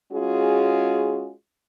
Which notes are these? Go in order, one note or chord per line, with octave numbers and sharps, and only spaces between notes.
G#3 C#4 F4 F#4 G#4